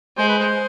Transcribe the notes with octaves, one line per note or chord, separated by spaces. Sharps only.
G#3 C5
B4
C5